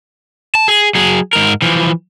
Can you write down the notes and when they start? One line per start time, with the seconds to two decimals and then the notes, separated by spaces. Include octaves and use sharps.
0.55 A5
0.68 G#4
0.95 F#3 G#4
1.33 G#2 A#4
1.62 E3 F3